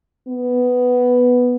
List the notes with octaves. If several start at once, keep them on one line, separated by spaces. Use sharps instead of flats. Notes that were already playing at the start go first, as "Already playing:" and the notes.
B3